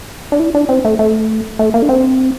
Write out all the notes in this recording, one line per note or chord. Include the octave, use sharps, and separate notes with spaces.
D4
E4
D4
C4
A3
A3
A3
A#3
D4
C4